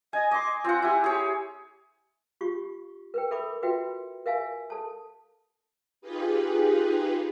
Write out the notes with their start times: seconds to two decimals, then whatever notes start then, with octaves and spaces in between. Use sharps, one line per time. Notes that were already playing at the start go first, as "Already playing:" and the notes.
0.13 D#5 G#5
0.31 D#5 C6 D6
0.64 C4 F4 F#5
0.82 E4 G4 G#5
1.04 G4 G#4 C#5
2.41 F4 G4 C#6
3.14 A#4 B4 G5
3.31 A4 A#4 E5 B5 D6
3.63 F4 F#4 B4 E5 G5
4.26 A#4 E5 F5 G#5
4.70 A4 A5
6.01 D#4 F4 G4 G#4 B4